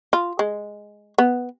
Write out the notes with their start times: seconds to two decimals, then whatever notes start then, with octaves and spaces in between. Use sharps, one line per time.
0.13 F4
0.39 G#3
1.18 B3